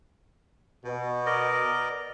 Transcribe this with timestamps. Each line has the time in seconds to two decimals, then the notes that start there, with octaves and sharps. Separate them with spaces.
0.85 B2
1.26 A#4 D5 D#5